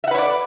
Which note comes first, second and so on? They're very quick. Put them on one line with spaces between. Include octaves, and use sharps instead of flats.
E5 F#5 B4 C#5 D5